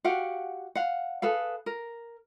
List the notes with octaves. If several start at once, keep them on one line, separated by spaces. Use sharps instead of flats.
F#4 G4 F5 F#5
F5 F#5
G#4 A4 B4 F5
A#4